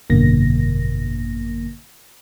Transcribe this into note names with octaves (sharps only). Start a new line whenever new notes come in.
G#1 F#2 B2 D3 A#3 A#6